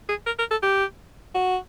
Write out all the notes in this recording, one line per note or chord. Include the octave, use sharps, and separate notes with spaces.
G#4
A#4
A#4
A4
G4
F#4